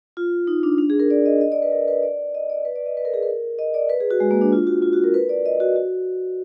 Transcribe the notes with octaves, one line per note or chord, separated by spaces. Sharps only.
F4
D#4
D4
D4
G#4
A#4
D5
D#5
D#5
D5
B4
A#4
B4
D5
D#5
D5
B4
D5
D#5
B4
A#4
G#4
A#4
D#5
D5
B4
G#4
F#4
G#3
A#3
D4
F4
F#4
F4
F#4
A#4
B4
D5
D#5
F#4
F#4